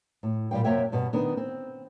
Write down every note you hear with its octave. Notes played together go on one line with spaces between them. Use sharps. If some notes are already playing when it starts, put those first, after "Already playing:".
A2
A#2 G3 A#3 F5 G5
F#2 C3 A#3 C#5 E5 G5
G2 B2
D#3 B3 D4
C4